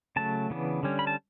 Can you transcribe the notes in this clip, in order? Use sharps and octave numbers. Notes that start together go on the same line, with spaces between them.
C#3 F#3 A3 A5
C#3 E3 B3 D4
D3 G3 C#4
B5
A5